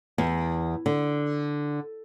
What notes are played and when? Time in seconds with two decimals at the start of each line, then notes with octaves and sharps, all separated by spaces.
0.18 E2
0.86 D3